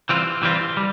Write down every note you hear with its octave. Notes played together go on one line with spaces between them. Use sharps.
E3 G3 C4 F4
E3 G3 C4 F4
G3